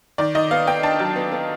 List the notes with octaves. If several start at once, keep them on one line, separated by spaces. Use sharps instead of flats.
D#3 D5
D#3 D#5
B3 F5
B3 G5
D4 A5
F#3
B3
B3